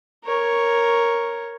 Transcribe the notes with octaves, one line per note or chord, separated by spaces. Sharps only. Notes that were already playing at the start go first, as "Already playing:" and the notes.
A#4 C#5